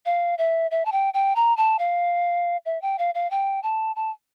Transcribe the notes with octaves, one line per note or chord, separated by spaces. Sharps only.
F5
E5
E5
A5
G5
G5
A#5
A5
F5
E5
G5
F5
F5
G5
A5
A5